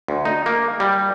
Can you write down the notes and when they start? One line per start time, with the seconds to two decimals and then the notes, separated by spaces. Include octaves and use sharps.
0.08 D2
0.25 D#4
0.46 A#3
0.80 G3